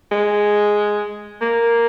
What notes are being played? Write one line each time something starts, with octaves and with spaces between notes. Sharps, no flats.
G#3
A#3